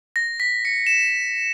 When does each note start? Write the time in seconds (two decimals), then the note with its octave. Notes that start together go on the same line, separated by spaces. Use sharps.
0.16 A#6
0.40 B6
0.65 C#7
0.87 E7